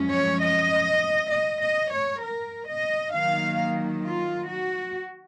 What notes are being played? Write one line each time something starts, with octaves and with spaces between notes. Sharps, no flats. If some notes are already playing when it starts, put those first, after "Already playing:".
Already playing: F#2 F3 G#3 C#4
C#5
D#5
D#5
D#5
C#5
A#4
D#5
D#3 F#3 A#3 F5
F4
F#4